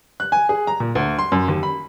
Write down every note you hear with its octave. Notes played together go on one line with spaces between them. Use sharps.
F#6
G#5
G#4
A#5
A#2
D2
C6
F#2
D#2
B5